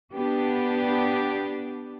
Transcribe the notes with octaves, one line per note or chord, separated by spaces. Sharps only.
B3 D4 G4